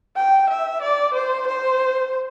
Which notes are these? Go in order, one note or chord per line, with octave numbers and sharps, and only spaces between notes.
G5
E5
D5
C5
C5